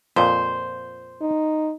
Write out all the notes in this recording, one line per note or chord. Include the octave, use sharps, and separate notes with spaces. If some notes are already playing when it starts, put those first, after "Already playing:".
F2 A#2 C5
D#4